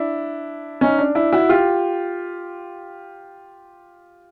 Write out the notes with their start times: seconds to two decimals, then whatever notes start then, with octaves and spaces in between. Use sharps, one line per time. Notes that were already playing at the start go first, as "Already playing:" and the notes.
Already playing: D4 E4
0.81 C#4 D#4
0.98 D4
1.15 D4 E4
1.33 E4 F#4
1.49 F4 G4